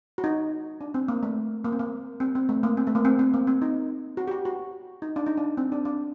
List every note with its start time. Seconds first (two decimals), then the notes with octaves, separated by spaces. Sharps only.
0.18 F#4
0.24 D#4
0.81 D4
0.94 C4
1.08 A#3
1.23 A3
1.64 A#3
1.72 C4
1.79 A#3
2.20 C4
2.35 C4
2.49 A3
2.63 A#3
2.77 C4
2.87 A3
2.95 A#3
3.05 C4
3.19 C4
3.34 A#3
3.47 C4
3.62 D#4
4.17 F#4
4.28 G4
4.31 F#4
4.45 F#4
5.02 D#4
5.16 D4
5.26 D#4
5.37 D4
5.57 C4
5.72 D4
5.85 D4